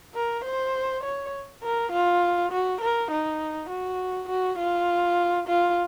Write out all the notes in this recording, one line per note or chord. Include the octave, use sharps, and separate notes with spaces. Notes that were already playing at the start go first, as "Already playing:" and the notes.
A#4
C5
C#5
A#4
F4
F#4
A#4
D#4
F#4
F#4
F4
F4